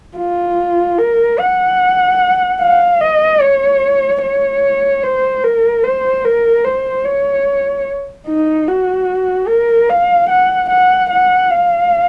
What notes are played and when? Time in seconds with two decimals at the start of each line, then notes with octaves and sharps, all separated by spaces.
0.18 F4
0.98 A#4
1.39 F#5
2.61 F5
3.01 D#5
3.41 C#5
4.22 C#5
5.03 C5
5.44 A#4
5.84 C5
6.25 A#4
6.65 C5
7.05 C#5
8.27 D#4
8.68 F#4
9.48 A#4
9.89 F5
10.30 F#5
10.70 F#5
11.10 F#5
11.51 F5